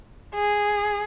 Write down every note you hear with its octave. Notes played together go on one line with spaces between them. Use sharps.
G#4